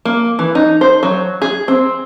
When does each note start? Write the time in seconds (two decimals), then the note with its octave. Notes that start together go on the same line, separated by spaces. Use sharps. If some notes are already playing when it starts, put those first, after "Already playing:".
0.05 A#3
0.39 E3
0.55 D#4
0.81 C5
1.03 F#3
1.42 G#4
1.68 C4